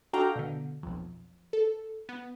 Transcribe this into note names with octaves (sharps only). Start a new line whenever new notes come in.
D4 F#4 A4 F5 G5 A#5
B2 D3
B1 F2
A4
B3